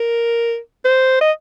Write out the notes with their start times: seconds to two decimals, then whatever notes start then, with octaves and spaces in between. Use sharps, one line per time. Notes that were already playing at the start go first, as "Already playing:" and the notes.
Already playing: A#4
0.85 C5
1.21 D#5